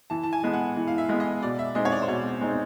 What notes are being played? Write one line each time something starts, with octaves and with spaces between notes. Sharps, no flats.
E3 A5
A5
G#5
G#3 B3
F#5
E3
F5
E5
G#3 B3
D#5
B2 D5
E5
G#3 C4 D#4 D#5
C#5
D5
C5
B2 C#5
G#3 C4 D#4